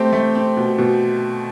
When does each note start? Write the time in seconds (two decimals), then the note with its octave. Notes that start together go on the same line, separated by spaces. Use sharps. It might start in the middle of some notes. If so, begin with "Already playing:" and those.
Already playing: A3 C4 G4
0.13 A3
0.35 C4
0.57 B2
0.78 B2